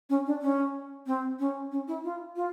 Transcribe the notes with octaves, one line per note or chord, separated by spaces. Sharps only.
C#4
D4
C#4
C4
C#4
C#4
E4
F4
F4